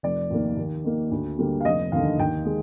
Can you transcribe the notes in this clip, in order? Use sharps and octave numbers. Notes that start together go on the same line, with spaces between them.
F1 D5
D#2 D#3 A#3
D#2
D#3 A#3
D2
D3 G3 A#3
F5
F1 D#5
D#2 D3 F5
D#2 G5
G#3